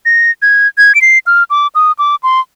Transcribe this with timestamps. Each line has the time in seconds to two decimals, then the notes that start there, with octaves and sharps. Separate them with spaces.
0.06 A#6
0.42 G#6
0.78 G#6
0.95 D7
1.02 C7
1.27 F6
1.50 D6
1.75 D#6
1.99 D6
2.23 C6